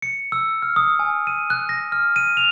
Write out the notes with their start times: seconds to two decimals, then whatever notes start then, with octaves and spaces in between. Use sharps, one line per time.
0.02 C#7
0.32 E6
0.62 F6
0.76 D#6
0.99 G#5
1.27 D#7
1.50 F#6
1.69 A#6
1.92 F6
2.16 D#7
2.37 F7